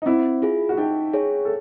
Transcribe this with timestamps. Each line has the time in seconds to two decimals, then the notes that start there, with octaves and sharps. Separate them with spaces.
0.02 D#4
0.06 C4 E4
0.42 F4 G#4
0.69 F#4
0.77 D#4 G4
1.13 G#4 C#5
1.45 A4